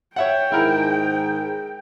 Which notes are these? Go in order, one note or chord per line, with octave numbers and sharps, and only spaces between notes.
C#5 E5 F#5 G5
G#2 D#3 E4 G#4 A#4